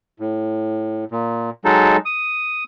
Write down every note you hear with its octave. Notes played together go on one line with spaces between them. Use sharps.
A2
A#2
F#3 G#3 D#4 A4
D#6